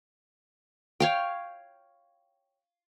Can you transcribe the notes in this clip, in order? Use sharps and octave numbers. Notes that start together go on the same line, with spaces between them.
C#5 F5 G5